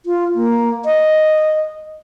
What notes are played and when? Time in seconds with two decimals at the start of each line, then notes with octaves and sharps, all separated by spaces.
0.06 F4
0.35 A#3
0.85 D#5